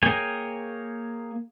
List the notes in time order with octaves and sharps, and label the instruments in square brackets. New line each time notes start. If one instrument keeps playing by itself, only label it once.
[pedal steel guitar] A#3 G#4 C#5 G5 G#5